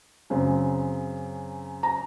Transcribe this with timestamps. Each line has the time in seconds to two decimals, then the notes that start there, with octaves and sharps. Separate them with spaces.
0.30 F#2 C#3 F#3 C4
1.83 A#5